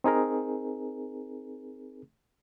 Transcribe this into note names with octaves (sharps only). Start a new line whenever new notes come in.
C4 D#4 G#4 A#4